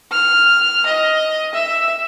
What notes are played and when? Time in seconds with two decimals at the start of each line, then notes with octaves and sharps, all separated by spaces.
0.12 F6
0.86 D#5
1.53 E5